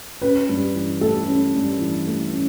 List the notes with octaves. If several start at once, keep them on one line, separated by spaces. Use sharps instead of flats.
C#4 B4
G2
E3
A3 A4
C#4
G2
E3
A3
C#4